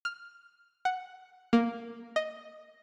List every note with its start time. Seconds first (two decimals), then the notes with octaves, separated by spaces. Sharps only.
0.05 F6
0.85 F#5
1.53 A#3
2.16 D#5